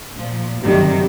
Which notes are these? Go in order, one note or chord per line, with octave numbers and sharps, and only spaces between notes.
A#2 F3
G1 F#2 C3 D#3 F#3 G3